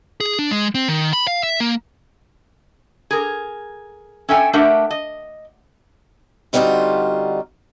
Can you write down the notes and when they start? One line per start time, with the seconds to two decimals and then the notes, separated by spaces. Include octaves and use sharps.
0.20 G#4
0.39 D4
0.51 G#3
0.75 C4
0.88 D#3
1.13 B5
1.27 F5
1.43 E5
1.60 A#3
3.11 G#4 A#4
4.29 C#4 A4 E5 G5 G#5
4.53 A3 D4 G4 A#4 E5 F#5
4.91 D#5
6.53 D3 G3 C4 D#4 F4 F#4